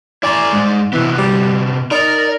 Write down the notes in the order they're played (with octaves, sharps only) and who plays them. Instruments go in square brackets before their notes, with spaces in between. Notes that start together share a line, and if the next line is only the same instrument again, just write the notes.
[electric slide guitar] E4 G#5 A#5 [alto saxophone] D5
[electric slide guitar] G#3 D#4
[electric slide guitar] C3 B3 [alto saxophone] E3
[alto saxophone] G3
[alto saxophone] D#4 [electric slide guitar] A#4 A#5 [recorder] D5